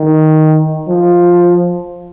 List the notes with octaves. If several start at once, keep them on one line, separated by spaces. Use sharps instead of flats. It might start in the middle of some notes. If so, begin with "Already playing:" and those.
Already playing: D#3
F3